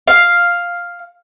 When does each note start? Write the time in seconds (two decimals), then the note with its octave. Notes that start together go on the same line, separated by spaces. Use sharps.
0.08 F5